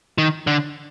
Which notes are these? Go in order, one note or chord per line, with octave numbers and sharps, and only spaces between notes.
D#3
D3